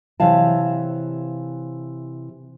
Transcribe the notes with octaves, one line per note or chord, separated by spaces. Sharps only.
C3 E3 C#5 F5 A5